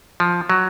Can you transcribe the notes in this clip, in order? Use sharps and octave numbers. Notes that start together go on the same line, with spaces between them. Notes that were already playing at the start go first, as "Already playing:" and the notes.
F3
F#3